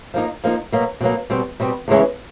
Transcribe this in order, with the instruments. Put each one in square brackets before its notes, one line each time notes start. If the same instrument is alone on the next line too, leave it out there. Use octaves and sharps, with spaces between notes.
[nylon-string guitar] F3 A#3 D#4
F3 A#3 D#4
B2 F#3 A#3
B2 F#3 A#3
B2 G3 C4
B2 G3 C4
E2 C#3 E3 G#3 C#4